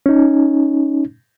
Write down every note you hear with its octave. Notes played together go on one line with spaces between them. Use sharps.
C#4 D#4